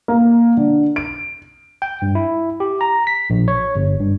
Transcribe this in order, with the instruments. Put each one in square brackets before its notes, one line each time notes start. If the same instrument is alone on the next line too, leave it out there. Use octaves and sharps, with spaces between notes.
[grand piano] A#3
D3
D7
[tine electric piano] G5
G2
E4
G4
A#5
B6
A#1
C#5
G1
G2